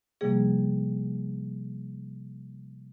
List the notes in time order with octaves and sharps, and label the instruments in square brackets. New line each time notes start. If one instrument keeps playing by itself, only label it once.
[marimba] C3 F3 G3 A#3 G#4